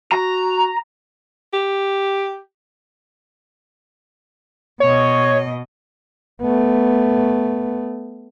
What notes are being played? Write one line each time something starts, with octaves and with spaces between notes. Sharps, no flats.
F#4 A#5
G4
B2 C#5 D#5
A3 B3